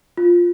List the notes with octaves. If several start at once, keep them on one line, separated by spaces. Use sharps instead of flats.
F4